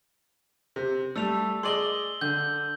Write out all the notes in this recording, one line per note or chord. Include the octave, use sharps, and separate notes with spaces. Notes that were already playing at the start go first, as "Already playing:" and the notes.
C3
G3 A3 A4 E6 F7
G#4 D5 D#5 C6 F#7 G7
D3 G6